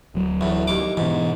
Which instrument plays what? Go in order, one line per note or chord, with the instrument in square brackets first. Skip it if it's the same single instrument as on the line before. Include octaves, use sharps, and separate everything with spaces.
[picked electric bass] D1 F#3
[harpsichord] E2 A2
D#2 D6
[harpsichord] G#2 [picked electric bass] B2 E3